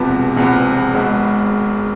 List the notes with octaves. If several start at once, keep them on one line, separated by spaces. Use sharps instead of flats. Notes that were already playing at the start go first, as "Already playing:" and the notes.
Already playing: E1 E2 C3 F3 B3 A5
E1 E2 C3 F3 B3
G#1 G#2 G#3 B3